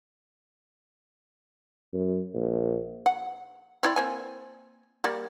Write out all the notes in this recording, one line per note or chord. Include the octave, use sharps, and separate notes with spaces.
F#2
A#1
F#5
C4 E4 D5
A#3 C4 G#5
G3 A#3 D5